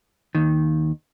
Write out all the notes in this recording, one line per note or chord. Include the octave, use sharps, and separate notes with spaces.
D#2 D#3